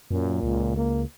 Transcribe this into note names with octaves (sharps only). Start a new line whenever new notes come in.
F#2 A#2
C#2
A#3